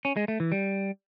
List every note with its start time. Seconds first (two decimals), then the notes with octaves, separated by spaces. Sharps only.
0.05 C#4
0.17 G#3
0.28 A3
0.40 E3
0.52 G3